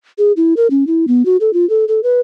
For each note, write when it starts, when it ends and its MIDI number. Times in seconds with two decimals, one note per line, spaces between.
0.18 0.32 68
0.37 0.54 64
0.57 0.67 70
0.70 0.86 61
0.87 1.06 64
1.08 1.25 59
1.25 1.37 66
1.41 1.53 69
1.53 1.68 65
1.70 1.85 69
1.88 2.00 69
2.03 2.20 71